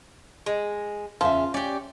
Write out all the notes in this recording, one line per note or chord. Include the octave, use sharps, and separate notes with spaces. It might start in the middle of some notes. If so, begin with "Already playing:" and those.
G#3
E2 C#3 F3 F4 E5
C#4 G4 D5